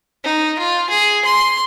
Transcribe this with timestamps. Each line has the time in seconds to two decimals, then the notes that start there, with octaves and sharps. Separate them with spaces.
0.24 D#4
0.59 F4
0.90 G#4
1.25 C6